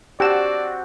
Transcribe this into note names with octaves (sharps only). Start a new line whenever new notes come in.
C4 D4 F#4 G4 D5 E7